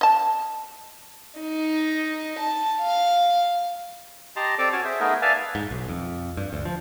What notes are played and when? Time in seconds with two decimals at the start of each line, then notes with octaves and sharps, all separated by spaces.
0.01 D#5 A5
1.40 D#4
2.40 A5
2.81 F5
4.36 G4 D#5 A5 A#5 C6
4.58 C4 A4 D5 D6
4.72 C#4 F#4 C#5 A5
4.85 G#4 C5 E5
5.00 A3 B3 D#4 G#4 A#4
5.22 B4 D5 E5 F5 G#5 A5
5.55 G#2
5.71 B1
5.89 F2
6.37 G2
6.53 D2
6.65 F3